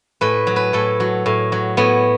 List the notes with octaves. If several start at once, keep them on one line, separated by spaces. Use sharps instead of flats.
A2 B4
F#3
B4
A2 A4
F#3
A2
F#3
A2 B3